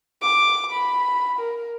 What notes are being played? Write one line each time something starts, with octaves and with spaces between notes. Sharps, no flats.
D6
B5
A#4